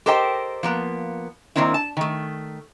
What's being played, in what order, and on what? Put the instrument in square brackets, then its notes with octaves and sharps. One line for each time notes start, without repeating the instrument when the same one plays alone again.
[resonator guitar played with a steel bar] G4 A4 A#4 C5 D#5 G5
F3 A#3 B3
D#3 E3 A#3 C4 D4 E4
A5
D#3 A3